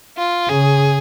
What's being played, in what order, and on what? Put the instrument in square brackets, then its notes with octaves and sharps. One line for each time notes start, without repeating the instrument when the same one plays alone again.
[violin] F4
[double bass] C#3 [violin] G#4